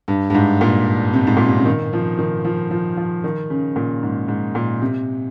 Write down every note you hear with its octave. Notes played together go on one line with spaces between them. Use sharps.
G2
G2
G#2
A#2
C3
G#2
A#2
C3
C#3
D#3
F3
D#3
F3
F3
F3
D#3
C#3
A#2
G#2
G#2
A#2
C3